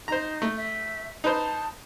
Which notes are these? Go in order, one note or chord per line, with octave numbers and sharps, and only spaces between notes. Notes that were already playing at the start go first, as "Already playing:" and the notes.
D#4 C5 A#5
A3
E5
D#4 B4 C5 A5